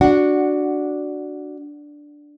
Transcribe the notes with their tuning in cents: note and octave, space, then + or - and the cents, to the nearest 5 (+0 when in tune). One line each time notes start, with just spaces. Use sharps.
D4 +0 F#4 -5 F#5 +0